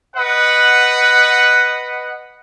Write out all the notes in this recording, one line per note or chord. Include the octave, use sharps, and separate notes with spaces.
B4 D#5 F#5